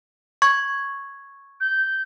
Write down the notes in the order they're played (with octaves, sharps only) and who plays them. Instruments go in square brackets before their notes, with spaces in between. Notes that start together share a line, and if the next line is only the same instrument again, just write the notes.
[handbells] C#6 G#6
[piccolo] G6